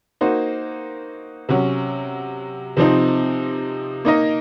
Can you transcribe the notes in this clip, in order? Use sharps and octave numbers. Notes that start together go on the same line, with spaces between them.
A#3 D#4 F#4 C5
C3 F#3 C#4
C3 F3 C4 D#4
A#3 D#4 A#4 D#5